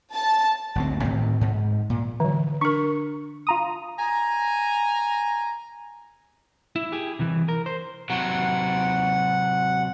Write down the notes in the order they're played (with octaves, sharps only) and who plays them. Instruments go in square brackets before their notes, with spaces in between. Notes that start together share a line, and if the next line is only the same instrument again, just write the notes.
[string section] A5
[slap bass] G1 D2 C4
A2 D#3 C4
G#2
A#2
[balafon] D3 [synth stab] E3 F#3
[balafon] D4 A#4 [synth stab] C#6
[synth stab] F4 A#5 D#6
[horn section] G#5 A#5
[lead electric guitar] E4
G4 G#4
C3 E3
A#4
C5
[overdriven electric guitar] C3 F#3 [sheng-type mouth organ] F#5